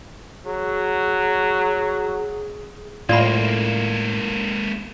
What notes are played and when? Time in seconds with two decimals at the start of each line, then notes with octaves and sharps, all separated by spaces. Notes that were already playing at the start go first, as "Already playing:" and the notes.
0.45 F#3 G#4
3.09 A2 G#3 A#3 F4 D5 B5